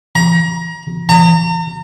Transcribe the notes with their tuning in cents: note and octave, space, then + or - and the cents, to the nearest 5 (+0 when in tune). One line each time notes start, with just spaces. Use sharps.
A#5 +30
A#5 -40